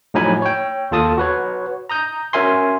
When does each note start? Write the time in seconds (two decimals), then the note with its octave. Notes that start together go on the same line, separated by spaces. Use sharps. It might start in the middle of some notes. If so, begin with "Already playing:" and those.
0.14 A2 F3 F#3 D#4 G#5 B5
0.42 C#5 G5
0.91 D#2 F4 A4 A5 D#6
1.18 F#4 B4 C#5
1.89 A#5 D#6 G6
2.33 C#4 F#4 A#4 E5 G#5 C6